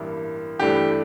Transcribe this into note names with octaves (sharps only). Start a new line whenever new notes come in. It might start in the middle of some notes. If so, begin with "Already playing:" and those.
Already playing: A1 G2 E3 A#3 E4
G2 E3 A3 D4 G4